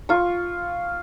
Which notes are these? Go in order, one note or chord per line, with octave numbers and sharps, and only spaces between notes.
F4 C#6